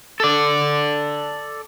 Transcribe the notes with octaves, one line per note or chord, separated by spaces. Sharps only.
A4 D5